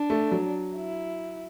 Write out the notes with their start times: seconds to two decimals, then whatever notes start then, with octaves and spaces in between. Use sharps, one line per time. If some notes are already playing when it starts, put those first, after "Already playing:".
Already playing: D4
0.10 A3
0.32 F#3
0.77 E4